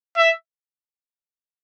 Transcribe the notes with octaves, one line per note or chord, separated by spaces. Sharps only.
E5